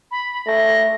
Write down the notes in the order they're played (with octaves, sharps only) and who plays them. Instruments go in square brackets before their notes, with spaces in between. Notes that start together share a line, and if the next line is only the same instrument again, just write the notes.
[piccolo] B5
[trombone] A3 [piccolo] A#6